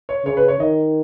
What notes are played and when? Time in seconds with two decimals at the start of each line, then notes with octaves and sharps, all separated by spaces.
0.09 C#5
0.25 C#3 C#5
0.37 B4
0.48 C#5
0.59 D#3 D#5